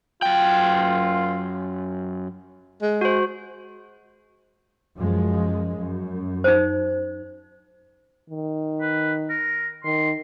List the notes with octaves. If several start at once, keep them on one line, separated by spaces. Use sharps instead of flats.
F#2 F4 G5
G#3
F#4 C5
F#2 F3 G#3
F#2
D#4 C5
D#3
B4
A#4
D#3 C6